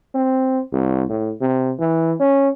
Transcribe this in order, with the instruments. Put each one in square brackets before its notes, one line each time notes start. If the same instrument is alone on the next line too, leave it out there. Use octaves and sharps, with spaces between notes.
[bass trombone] C4
C2
A2
C3
E3
C#4